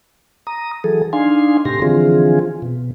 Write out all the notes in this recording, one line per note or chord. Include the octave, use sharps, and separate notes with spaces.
A#5 D#6
E3 F#3 G#4 A4
D4 D#4 F5 G#5 C6
A2 C3 G4 C6 A#6
D3 E3 F3 C4 F4 G#4
B2